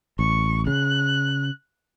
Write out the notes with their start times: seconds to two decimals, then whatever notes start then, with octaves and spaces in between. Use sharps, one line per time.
0.19 A1 C#6
0.67 C#3 F#6